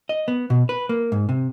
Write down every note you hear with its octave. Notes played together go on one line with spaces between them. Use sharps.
D#5
B3
B2
B4
A#3
G#2
C3